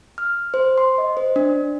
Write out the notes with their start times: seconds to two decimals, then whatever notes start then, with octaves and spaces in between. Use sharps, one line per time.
0.18 F6
0.54 C5
0.78 C6
0.98 D#5
1.17 C5
1.36 D4